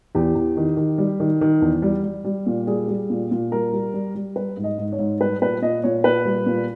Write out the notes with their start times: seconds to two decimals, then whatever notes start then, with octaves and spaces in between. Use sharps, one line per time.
0.15 E2 G4
0.35 E2
0.57 D#3
0.77 D#3
0.98 G3
1.20 D#3
1.41 D#3
1.61 E2
1.82 G3
2.03 G3
2.24 G3
2.46 A#2
2.67 G3 G#4
2.88 G3
3.10 A#2
3.31 A#2
3.52 G3 A#4
3.73 G3
3.94 G3
4.15 G3
4.36 G3 B4
4.57 G#2
4.64 D#5
4.78 G#2
4.92 C#5
4.99 G#2
5.21 G3 B4
5.41 A#2 B4
5.62 A#2 D#5
5.84 A#2 C#5
6.04 A#2 B4
6.25 G3
6.46 A#2